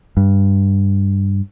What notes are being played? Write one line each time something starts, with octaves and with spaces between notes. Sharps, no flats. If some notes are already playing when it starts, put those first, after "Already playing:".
G2